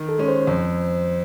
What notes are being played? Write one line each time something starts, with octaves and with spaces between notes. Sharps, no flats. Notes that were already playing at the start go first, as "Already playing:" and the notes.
Already playing: D#3
A4
G#3 C#4
C5
F2